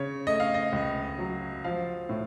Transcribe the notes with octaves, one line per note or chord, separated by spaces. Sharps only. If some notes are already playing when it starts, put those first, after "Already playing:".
Already playing: C#3 C#5
A3 D#5
F5
D#5
C#2
F#3
F3 F5
A2